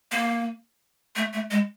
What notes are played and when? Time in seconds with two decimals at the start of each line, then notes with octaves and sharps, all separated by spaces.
0.11 A#3
1.16 A3
1.33 A3
1.50 G#3